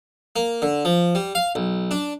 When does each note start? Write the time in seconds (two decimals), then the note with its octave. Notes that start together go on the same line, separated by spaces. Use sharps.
0.36 A#3
0.62 D3
0.85 F3
1.15 G3
1.35 F5
1.55 B1
1.91 D4